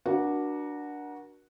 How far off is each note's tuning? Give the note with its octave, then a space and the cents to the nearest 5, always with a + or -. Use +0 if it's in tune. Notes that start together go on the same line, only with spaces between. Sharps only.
D4 +0 F#4 -5 A#4 +35